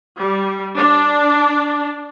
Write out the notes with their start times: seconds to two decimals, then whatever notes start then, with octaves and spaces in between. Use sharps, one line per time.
0.18 G3
0.76 D4